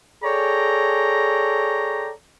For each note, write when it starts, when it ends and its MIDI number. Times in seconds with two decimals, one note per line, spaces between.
0.23 2.10 68
0.23 2.10 69
0.23 2.10 73
0.23 2.10 74
0.23 2.10 79
0.23 2.10 82